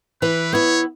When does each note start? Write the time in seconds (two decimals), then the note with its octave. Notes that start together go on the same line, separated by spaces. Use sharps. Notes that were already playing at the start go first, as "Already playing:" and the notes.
0.21 E3 B4
0.53 B3 E4 C#5